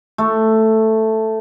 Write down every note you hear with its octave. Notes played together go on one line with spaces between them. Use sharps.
A3